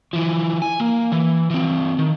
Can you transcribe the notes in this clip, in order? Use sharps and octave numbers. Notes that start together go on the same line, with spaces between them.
E3 F3
G#5
A#3
E3
E3 C4
D#3